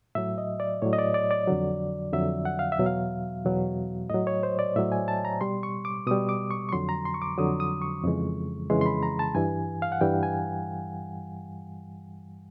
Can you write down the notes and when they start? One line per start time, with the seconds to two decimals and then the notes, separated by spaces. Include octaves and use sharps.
0.15 A2 F#3 E5
0.38 D#5
0.60 D5
0.82 A2 F#3 C#5
0.93 D#5
0.99 D5
1.14 D5
1.31 D5
1.47 F2 D3 F#3
2.13 F2 D3 F#3 E5
2.45 F#5
2.59 F5
2.72 E5
2.78 E2 B2 F#3
2.86 F5
3.44 E2 B2 F#3
4.10 A2 F#3 D#5
4.27 C#5
4.43 C5
4.59 D5
4.76 A2 F#3 E5
4.92 G#5
5.08 A5
5.25 A#5
5.41 B2 G3 C6
5.63 C#6
5.85 D6
6.06 B2 G3 D#6
6.29 D6
6.51 C#6
6.69 C#6
6.72 F2 D3 F#3 C6
6.89 A#5
7.05 C6
7.14 C#6
7.22 D6
7.38 F2 D3 F#3 D#6
7.60 D#6
7.82 C#6
8.04 F2 C#3 E3 G#3
8.70 F2 C#3 E3 G#3 C6
8.81 C6
8.86 B5
9.03 A#5
9.19 A5
9.35 G2 E3 G3 G#5
9.82 F5
9.92 F#5
10.01 G2 E3 G3 G5
10.23 G#5